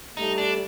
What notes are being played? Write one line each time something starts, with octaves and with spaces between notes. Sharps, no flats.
G3 A3 D#4
D4